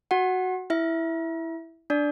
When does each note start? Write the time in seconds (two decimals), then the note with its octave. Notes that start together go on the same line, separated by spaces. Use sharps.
0.11 F#4 F#5
0.70 E4 E5
1.90 D4 D5